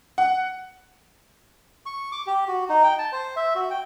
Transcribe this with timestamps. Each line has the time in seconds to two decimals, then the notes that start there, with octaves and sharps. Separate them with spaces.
0.18 F#5
1.86 C#6
2.12 D6
2.26 G4
2.48 F#4
2.69 D#4
2.83 G5
2.98 A5
3.12 C5
3.36 E5
3.55 F#4
3.70 G5